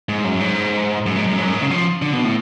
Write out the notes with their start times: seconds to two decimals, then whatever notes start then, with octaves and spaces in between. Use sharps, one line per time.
0.09 G#2
0.24 F#2
0.40 G#2
1.06 F#2
1.17 G#2
1.27 F#2
1.37 G#2
1.45 F#2
1.53 G#2
1.62 C#3
1.70 F3
2.02 D3
2.13 B2
2.24 A2